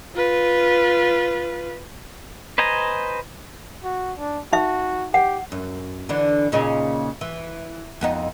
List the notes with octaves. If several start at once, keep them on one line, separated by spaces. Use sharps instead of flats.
F4 B4
B4 C5 D#5 G#5 A#5
F#4
D4
D#4 F#4 E5
G4 F#5
F#2
D3 E3 D4
A#2 C#3 D#4
E3
F2 B3 D#4